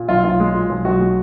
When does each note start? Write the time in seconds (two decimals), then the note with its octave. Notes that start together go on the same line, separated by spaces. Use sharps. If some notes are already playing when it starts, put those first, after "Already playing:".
Already playing: A#2
0.08 B1 F4
0.24 B1 F4
0.40 G#3
0.55 A#2
0.70 B1
0.85 B1 F#4
1.00 G#3